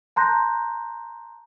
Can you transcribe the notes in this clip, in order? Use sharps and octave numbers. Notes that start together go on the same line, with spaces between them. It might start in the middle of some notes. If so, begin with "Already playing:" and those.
A5 A#5 C6 F#6 G6 A#6